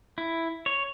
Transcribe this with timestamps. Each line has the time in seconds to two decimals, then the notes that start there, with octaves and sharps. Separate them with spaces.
0.18 E4
0.66 C#5